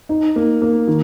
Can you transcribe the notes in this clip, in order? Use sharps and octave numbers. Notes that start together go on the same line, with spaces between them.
D#4
A#3
A#3
D#3